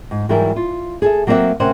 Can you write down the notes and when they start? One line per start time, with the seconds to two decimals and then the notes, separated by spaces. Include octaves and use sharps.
0.11 G#2
0.29 G#2 E3 F#3 G3 E4 A#4
0.56 F4
1.02 G#4 A4 E5
1.27 F#3 A#3 C4 C#5 E5 F#5
1.60 D2 C3 C#4 A#4 C5 F#5